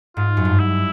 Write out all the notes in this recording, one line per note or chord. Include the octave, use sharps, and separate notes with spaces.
G#2 F4
F#2
G2
E4